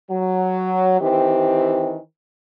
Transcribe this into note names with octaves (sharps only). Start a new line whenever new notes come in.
F#3
D#3 E3 C4 G4